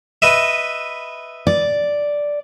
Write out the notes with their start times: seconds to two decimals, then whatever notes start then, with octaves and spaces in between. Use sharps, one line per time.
0.22 B4 D#5 E5
1.47 D5